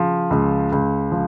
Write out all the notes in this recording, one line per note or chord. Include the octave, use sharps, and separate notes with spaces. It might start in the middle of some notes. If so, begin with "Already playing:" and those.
Already playing: C#3 F3
C#2
C#2
F3